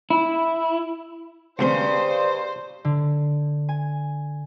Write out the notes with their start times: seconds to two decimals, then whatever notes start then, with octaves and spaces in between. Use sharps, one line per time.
0.10 E4
1.59 D2 G2 C#3 C4 C5 D5 C6
2.85 D3
3.69 G#5